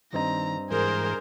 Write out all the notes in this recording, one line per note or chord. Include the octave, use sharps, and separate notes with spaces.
G2 D#3 C4 D#5 A#5
G#2 E3 G#4 A#4 C5